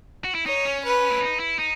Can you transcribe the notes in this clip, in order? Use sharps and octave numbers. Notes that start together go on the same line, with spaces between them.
F#4
E4
D#4 C#5
C#4
B4
E4
D#4
E4
D#4